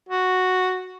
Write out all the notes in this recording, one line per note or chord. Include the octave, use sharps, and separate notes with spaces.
F#4